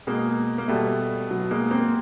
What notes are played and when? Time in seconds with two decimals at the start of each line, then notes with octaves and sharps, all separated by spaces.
0.07 B2 G#3 A#3
0.58 A#3
0.68 B2 G3 A3
1.30 B2 F#3
1.51 G#3 A#3
1.71 A#3 C4